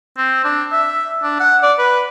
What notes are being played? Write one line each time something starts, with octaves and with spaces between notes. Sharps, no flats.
C4
D4
E5
D4
F#5
D5
B4